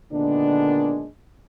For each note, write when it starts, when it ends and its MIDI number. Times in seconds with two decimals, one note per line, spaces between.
0.12 1.09 46
0.12 1.09 50
0.12 1.09 51
0.12 1.09 56
0.12 1.09 59
0.12 1.09 62